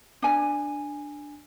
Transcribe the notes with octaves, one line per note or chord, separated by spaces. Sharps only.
D4 G#5